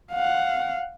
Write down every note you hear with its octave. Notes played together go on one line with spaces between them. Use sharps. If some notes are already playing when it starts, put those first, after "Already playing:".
F5 F#5